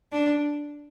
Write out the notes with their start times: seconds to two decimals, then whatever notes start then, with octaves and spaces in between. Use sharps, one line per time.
0.12 D4